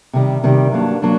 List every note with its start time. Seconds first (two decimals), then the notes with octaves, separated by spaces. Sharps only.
0.13 C3 D#3 G3
0.44 C3 D#3 G3
0.72 G2 F#3 A#3 D4
1.02 F#3 A#3 D4